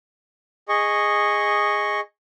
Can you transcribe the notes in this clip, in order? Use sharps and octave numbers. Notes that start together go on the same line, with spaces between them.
G#4 D#5 C#6